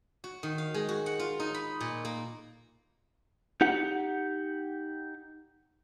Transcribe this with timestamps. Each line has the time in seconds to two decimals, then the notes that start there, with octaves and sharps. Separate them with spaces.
0.24 F#4
0.43 D#3
0.58 F5
0.74 G#3
0.89 F#4
1.06 F#5
1.19 F4
1.40 D#4
1.54 B5
1.80 A#2
2.05 A#3
3.61 D#4 G4 F#5